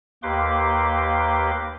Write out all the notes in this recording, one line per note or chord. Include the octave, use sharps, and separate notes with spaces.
D#2 A#3 G4 B4 C6 D6